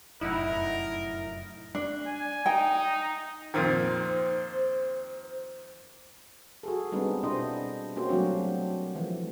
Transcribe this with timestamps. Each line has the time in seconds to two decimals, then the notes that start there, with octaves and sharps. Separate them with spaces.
0.21 F1 F#2 A2 D#4 E4 A#4 F#5
1.75 D4
2.07 G#5
2.46 D#4 G5
3.54 F2 A#2 D#3 C5
6.63 F#4 G#4 A4
6.92 G3 G#3 B3 C4 D4 D#4
7.23 B2 D4 E4 C5 D#5
7.96 A#3 C#4 F#4 G4 C5
8.09 F#3 G3 A3 C4 D4 F#4
8.95 E3 F3 A3